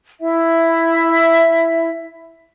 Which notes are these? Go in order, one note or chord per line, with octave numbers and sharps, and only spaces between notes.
E4 E5